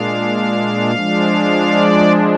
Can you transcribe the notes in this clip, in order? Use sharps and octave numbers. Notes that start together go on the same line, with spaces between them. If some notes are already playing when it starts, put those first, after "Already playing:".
Already playing: A#2 G#3 D4 F5
F3 G#3 D4
D5